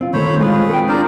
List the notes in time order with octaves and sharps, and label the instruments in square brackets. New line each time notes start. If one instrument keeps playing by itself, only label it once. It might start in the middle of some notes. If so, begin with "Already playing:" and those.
[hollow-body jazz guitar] C4 F4
[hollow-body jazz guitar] D#3 A3 [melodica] C5 C#5 B5
[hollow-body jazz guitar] G#3 C4 F4 [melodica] G#4 B4
[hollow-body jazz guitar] A4 G5
[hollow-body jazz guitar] D4 F4 [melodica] A#4 C5 D5